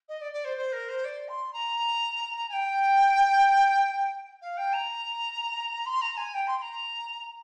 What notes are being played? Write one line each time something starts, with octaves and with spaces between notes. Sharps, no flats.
D#5
D5
D5
C5
C5
A#4
C5
D5
C6
A#5
G#5
G5
F5
G5
A#5
C6
A#5
G#5
G5
C6
C6
A#5